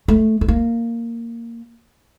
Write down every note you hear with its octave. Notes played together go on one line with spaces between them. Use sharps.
A3
A3
A#3